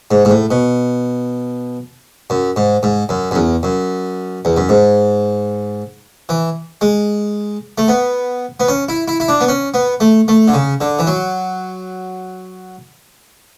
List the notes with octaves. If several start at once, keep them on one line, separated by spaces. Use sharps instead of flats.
G#2
G#2
A2
B2
F#2
G#2
G#2
F#2
F#2
E2
F#2
E2
F#2
G#2
E3
G#3
A3
B3
B3
C#4
E4
E4
E4
D4
B3
C#4
B3
A3
A3
D3
C#3
D3
E3
F#3